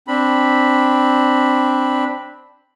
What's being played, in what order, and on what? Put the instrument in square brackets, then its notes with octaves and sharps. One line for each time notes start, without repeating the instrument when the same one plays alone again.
[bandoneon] C4 D4 B5